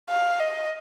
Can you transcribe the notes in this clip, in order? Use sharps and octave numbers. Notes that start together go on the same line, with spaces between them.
F5
D#5